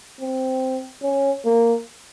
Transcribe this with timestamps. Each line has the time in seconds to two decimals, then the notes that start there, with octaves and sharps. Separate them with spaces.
0.20 C4
1.03 C#4
1.45 A#3